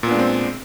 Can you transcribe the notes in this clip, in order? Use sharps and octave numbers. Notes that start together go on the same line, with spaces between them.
A#2 G#3 B3 C4 D4